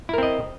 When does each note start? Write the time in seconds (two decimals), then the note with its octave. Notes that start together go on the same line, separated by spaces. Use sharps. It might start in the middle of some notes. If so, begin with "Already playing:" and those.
0.09 E4
0.14 A#4
0.18 C4
0.23 D#5